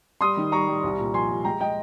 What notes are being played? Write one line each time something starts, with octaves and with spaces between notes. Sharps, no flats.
G3 C6 D#6
D#3
G3 A#5 C#6
G3
C2
A#2
F3 G#5 C6
C2
G#3 G5 A#5
G#3 D#5 G5